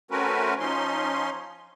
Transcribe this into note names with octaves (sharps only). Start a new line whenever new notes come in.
A3 C4 C#4 F#4 A#4 B4
F3 C#4 D#4 C6